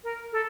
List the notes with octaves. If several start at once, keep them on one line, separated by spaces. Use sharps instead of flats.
A#4
A4